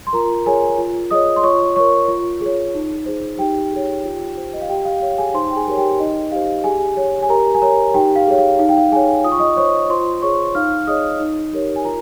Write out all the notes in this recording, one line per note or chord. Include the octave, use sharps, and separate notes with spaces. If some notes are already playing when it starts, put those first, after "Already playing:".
C6
F4 A#4 A#5
G#4 A#4 C#5 G#5
F4
G#4 C#5 D#5 D#6
C6
F4 C#5 C#6
A#4 C#5 C#6
F4
G#4 C#5
D#4
G#4 C5
D#4 G4 G5
G#4 C#5
F4
C5
D#5
F5
G4 G5
F5
C#5 F5
G#4 G#5
D#4 C5 C6
G5
G#4 G#5
G4 A#4 C#5
G4 G5
D#4 D#5
G4 C5 F5
G4 G#4 G#5
C#5
G#5
G4 A#4 A#5
G#5
A#4 C#5 A#5
D#4 G4 G5
F5
G#4 C#5
F5
D#4 F5
G5
F5
G#4 C#5 G#5
F4 D#6
C#6
D#5 D#6
C5 C#5 C#6
F4 C5 C6
G#4 C#5 C#6
D#4 F5 F6
G#4 C#5 D#5 D#6
D#4
G4 A#4 C#5
G#5
F4 A#4 A#5